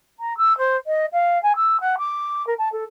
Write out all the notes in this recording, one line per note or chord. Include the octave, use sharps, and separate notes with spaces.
A#5
E6
C5
D#5
F5
G#5
E6
F#5
D6
A#4
A5
A4